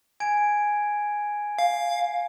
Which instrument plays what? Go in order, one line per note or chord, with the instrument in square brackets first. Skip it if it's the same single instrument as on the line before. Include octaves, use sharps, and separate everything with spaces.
[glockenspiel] G#5 G#6 D7
[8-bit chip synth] F5